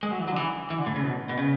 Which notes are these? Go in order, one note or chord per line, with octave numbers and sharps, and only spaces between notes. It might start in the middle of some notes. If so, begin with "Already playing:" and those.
G#3
F#3
E3
F#3
D3
E3
E3
D3
A2
C#3
B2
B2
C#3